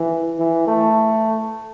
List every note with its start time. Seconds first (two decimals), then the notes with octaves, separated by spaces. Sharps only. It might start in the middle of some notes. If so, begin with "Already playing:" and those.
Already playing: E3
0.39 E3
0.67 A3